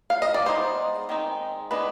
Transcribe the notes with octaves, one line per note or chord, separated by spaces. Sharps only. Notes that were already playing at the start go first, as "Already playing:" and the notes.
F5
D#5
D5
G#3 B3 D#4 C5
D#3 G#3 C4 D#4
D#3 G#3 B3 D4 B4